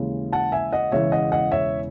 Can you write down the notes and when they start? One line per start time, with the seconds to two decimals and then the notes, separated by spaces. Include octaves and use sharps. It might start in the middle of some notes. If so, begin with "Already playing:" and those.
Already playing: D#2 C#3 E3 G#3
0.33 F#5 A5
0.52 E5 G#5
0.73 D#5 F#5
0.92 E1 E2 C#3 E3 C#5 E5
1.12 D#5 F#5
1.32 D#5 F#5
1.51 C#5 E5